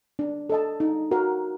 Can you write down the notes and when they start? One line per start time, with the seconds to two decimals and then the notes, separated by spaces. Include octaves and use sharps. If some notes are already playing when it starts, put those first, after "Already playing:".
0.19 D4
0.50 A4 D#5 A5
0.80 D#4
1.11 F#4 A#4 F#5